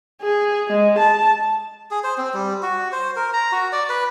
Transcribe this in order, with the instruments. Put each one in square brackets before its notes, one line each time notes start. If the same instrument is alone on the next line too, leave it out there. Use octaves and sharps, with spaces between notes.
[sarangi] G#4
G#3
A5
[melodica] G#4
C5
C4
G3
F#4
C5
A#4
A#5
F#4
D5
B4